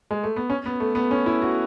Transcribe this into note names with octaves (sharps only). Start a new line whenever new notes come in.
G#3
A3
B3
C#4
B3
A3
B3
C#4
E4
F#4